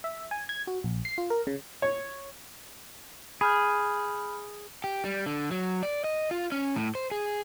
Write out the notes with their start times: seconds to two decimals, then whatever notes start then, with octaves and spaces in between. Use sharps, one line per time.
0.04 E5
0.31 G#5
0.49 G#6
0.67 F#4
0.84 A#1
1.05 C7
1.18 F4
1.30 A#4
1.47 C#3
1.82 C#5
3.41 G#4 B5 F6 G6
4.84 G4
5.05 G3
5.26 D3
5.51 F#3
5.83 D5
6.04 D#5
6.31 F4
6.52 C#4
6.76 A2
6.95 C5
7.11 G#4